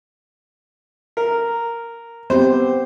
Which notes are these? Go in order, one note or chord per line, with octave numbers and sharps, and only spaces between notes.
A#4
B3 C4 G4 C5